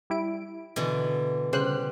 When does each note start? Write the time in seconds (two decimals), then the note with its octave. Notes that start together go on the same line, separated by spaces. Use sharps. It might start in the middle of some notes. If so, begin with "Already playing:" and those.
0.10 G3 E4 D7
0.76 B2 D3 E3
1.53 C#3 G3 C5 F#6